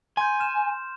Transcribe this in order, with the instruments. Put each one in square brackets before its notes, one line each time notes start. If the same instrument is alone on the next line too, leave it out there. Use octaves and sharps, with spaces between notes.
[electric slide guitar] G#5 [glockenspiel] C6 G6
[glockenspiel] F6 E7